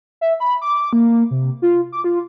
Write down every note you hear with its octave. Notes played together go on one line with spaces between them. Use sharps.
E5
B5
D6
A#3
C3
F4
D6
F4